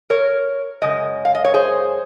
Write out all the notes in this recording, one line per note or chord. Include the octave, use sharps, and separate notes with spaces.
A#4 C#5
F#2 C#3 G#3 D#5
F5
D#5
C#5
G#4 C5